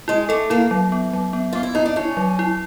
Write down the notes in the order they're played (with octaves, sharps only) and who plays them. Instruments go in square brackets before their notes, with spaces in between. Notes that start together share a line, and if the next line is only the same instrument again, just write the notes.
[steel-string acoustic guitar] G#3 [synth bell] E4
[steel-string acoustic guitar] A3 [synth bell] A4
[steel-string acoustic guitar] A#3 [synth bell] E4
[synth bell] F#3
B3
F#3
B3
[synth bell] B3 [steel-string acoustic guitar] F4
[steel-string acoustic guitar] E4
[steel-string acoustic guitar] D#4 [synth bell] E4
[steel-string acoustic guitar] D4
[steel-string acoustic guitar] C#4 [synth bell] E4
[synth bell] F#3
E4